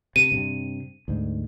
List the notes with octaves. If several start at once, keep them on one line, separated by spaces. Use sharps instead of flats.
C3 D#7
G2 C3
D2 G#2